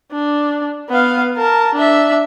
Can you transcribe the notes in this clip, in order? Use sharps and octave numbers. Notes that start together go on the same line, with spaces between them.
D4
B3 F5
A#4 A5
D4 E5